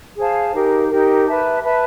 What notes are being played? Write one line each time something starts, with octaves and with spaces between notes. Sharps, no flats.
G#4 C5 F5 A5
D#4 G4 A#4
D#4 G4 A#4
B4 E5 A5
B4 E5 A5